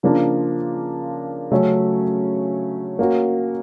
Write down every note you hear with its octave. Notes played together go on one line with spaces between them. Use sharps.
C#3 F3 A#3 D4 F4
C#3 F#3 A3 C#4
A#3 C#4 F#4